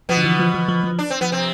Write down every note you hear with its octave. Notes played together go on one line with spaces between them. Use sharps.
B2 F3 B3
D3
E3
F3
F3
F3
F3
D4
C4
F3 B3
C3 C4